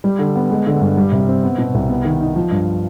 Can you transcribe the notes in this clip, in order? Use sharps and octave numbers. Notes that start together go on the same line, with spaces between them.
G3
D3
B3
G#3
D3
G2
G3
C3
C4
B3
B2
C2
B3
D#3
D#4
F3
G2